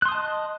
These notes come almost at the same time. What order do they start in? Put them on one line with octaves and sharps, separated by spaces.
F#6 C6 D#6 A5 D#5